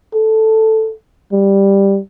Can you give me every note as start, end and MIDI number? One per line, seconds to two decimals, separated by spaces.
0.14 0.93 69
1.32 1.98 55